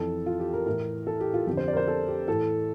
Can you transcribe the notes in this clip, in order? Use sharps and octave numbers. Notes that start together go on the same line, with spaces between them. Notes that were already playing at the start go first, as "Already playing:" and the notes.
Already playing: F2 E3 A4
F4
G4
A#4
A2 E3 A#4
A4
G4
F4
F2 D3 G4
C5
D5
A#4
C5
A4
G4
A2 E3 A4